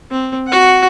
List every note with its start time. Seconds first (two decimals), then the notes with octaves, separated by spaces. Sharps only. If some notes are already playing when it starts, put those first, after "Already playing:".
0.11 C4
0.48 F#4 F#5